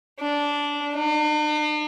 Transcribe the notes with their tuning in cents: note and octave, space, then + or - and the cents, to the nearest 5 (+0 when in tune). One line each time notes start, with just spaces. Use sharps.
D4 -15
D4 +45